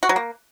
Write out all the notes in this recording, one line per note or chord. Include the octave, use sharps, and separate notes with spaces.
F#4
F#3
A#3